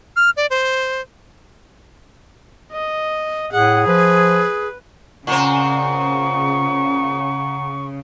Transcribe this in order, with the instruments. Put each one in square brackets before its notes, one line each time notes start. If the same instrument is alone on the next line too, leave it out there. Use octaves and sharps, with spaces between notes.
[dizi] F6
D5
C5
[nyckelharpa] D#5
[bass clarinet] A2 [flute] G#4 [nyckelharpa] F#5
[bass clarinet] F3 [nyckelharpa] B4
[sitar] A#2 C4 [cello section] C#3 [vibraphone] F#5 A#5 [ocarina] C#6